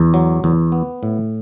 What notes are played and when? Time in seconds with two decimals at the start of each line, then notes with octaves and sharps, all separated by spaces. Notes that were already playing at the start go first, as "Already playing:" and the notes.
Already playing: E2
0.14 F#3
0.44 E2
0.72 B3
1.03 A2